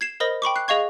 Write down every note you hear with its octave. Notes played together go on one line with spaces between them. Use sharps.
G#6 C7 E7
A#4 C5 D#5 B5 D#6 A#6
G5 B5 C#6 D6
F#6 C7
G#4 D#5 F5 C#6 G#6